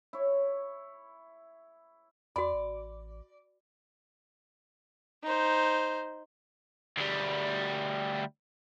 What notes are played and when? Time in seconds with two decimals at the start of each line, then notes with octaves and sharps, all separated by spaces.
0.13 E4 C#5
2.36 E2 F#4 D5 B5
2.54 A1
5.23 D#4 C5
6.97 D2 G3